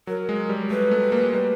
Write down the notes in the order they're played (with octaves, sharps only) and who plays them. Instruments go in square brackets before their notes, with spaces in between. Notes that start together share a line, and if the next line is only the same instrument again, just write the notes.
[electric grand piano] F#3 [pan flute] A#4
[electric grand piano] G#3
G3
[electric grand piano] A3 [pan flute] B4
[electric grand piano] A3
A#3
G#3
G3